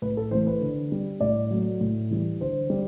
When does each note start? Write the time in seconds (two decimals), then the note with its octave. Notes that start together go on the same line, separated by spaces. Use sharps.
0.02 A2 B4
0.17 A4
0.31 E3 A3 C5
0.47 B4
0.62 D3
0.92 G3
1.21 A2 D5
1.51 F#3 A3
1.81 A2
2.11 E3 G3
2.40 D3 C5
2.70 G3